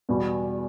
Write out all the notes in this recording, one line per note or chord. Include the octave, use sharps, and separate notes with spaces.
E2 B2 G3